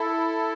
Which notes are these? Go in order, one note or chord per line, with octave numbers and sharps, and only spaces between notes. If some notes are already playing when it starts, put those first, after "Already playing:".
Already playing: E4 A4